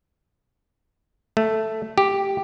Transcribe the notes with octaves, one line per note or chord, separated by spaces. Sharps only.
A3
G4